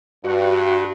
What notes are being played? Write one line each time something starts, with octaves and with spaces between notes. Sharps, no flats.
G2 F#4